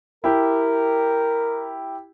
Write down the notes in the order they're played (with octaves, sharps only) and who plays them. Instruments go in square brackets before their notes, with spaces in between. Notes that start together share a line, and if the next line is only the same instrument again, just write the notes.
[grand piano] E4 G4 [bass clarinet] A#4